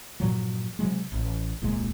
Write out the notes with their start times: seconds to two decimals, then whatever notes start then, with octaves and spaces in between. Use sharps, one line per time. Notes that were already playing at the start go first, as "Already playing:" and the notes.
0.20 G2 A#2 F3 F#3
0.79 C3 F#3 G#3
1.12 A1
1.61 D#1 C2 A#2 G#3